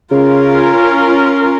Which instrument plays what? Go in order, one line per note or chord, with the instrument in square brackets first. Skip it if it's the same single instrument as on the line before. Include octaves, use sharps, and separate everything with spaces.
[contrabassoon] C#3 [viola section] C#4 F4 A#4